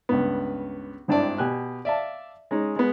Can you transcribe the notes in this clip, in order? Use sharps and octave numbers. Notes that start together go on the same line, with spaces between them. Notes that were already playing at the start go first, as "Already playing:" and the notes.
C#2 G2 B3
G#1 G2 D4 E4 D5 A5
B2 G4 G#5 F#6
D5 E5 F5 A5
G#3 C#4 D#4
G#3 B3